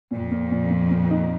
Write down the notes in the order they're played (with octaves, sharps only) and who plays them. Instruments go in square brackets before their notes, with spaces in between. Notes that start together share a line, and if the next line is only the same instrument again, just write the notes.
[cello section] F2 [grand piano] A#2
[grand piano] A#2
A#2
A#2
A#2
D#4